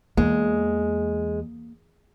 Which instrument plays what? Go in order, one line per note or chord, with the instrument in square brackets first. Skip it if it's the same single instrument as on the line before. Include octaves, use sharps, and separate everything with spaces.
[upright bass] E2 [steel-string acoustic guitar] G#3 [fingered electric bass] A#3